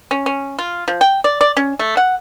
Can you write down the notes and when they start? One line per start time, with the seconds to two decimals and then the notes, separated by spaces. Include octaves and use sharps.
0.11 C#4
0.26 C#4
0.59 F4
0.88 F3
1.01 G5
1.24 D5
1.41 D5
1.57 C#4
1.79 A3
1.97 F#5